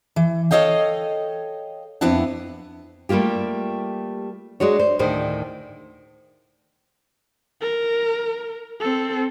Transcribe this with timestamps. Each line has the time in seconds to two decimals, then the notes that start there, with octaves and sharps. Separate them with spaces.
0.16 E3
0.51 A4 C#5 D#5 F5 G5
2.01 F2 B3 C4 D4 E4 F#5
3.09 G3 A3 A#3 F4 G4
4.60 G#3 D4 F#4 C#5
4.79 C5
4.99 D2 A2 D#3 C5
7.61 A#4
8.80 C4 A4